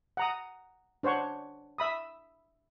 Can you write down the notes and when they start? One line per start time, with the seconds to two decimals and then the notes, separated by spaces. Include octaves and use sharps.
0.17 F#5 A#5 D#6
1.03 D4 C5 C#5 F#5 C#6
1.78 E5 B5 D#6